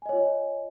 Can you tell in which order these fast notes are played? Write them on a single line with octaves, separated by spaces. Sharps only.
G#5 D#5 C#5 F4